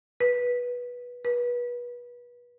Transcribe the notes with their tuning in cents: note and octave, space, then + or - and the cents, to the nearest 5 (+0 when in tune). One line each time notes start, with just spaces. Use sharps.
B4 -15
B4 -30